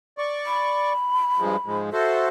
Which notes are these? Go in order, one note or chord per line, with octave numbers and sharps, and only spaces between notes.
D5 C#6
B5
G2 F3 G#3
G#2 F3 G#3
F#4 A4 C5 E5